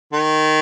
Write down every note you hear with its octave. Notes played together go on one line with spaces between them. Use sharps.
D#3